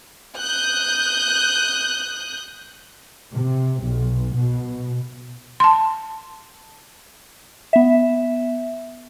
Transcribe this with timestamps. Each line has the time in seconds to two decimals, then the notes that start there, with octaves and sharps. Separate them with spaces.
0.37 D#6 F#6 G6
3.34 C3
3.82 B1
4.34 B2
5.60 A5 C6
7.73 B3 E5